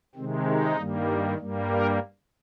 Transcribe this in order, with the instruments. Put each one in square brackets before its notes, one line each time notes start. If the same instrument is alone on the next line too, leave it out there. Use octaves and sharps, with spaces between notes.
[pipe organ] C3 D#3 G#3 C4
D#4
G2 D#3 G3 A#3
G2 G3 A#3
A#4